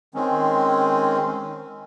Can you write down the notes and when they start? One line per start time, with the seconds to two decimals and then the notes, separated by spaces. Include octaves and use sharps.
0.14 D#3 G#3 C4 C#4